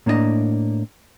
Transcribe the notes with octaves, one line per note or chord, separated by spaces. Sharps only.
A2 A#3 D4 D#4 D#5 A#5